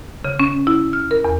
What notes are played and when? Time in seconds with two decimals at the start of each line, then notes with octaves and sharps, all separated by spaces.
0.24 C#3
0.40 C#4
0.67 E4
0.93 F6
1.11 A#4
1.24 E2